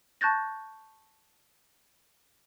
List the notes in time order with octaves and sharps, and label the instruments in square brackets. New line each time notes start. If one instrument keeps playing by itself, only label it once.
[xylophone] A5 C#6 F#6 G6 A6 A#6